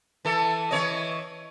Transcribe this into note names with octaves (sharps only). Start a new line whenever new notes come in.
E3 A4
E3 C#5 D#5